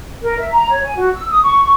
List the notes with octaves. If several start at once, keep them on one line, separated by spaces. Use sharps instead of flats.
A#4
E5
A#5
C#5
G#5
F#4
E6
D#6
C#6
C#6